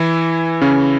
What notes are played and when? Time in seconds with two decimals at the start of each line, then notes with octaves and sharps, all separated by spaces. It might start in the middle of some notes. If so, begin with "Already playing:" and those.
Already playing: E3 E4
0.61 C#3 C#4